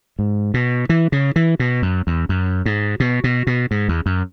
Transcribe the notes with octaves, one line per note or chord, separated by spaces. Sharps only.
G#2
B2
E3
C#3
E3
B2
F#2
E2
F#2
G#2
B2
B2
B2
G#2
E2
F#2